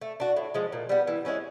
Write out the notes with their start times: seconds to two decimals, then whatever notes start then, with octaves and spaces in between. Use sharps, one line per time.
0.01 A3
0.20 D4 F#4
0.36 A2
0.54 F3 G#3
0.72 A#2
0.89 G3 B3
1.07 E3
1.25 G#3 C#4 E4